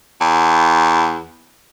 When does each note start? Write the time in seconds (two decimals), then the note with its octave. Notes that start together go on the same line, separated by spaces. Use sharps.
0.21 E2